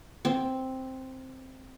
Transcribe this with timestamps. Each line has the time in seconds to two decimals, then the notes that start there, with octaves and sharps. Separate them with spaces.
0.25 C4